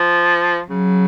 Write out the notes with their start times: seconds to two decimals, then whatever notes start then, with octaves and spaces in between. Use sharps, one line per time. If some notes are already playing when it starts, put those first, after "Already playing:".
Already playing: F3
0.69 C#3 F#3